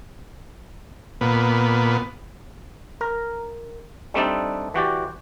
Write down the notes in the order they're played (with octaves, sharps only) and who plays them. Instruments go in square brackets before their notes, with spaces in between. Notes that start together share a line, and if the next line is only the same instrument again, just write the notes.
[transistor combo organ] A#2 B3
[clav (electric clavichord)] A#4
G3 A3 C4 D4 D#4 A4
E3 F#4 G4 D5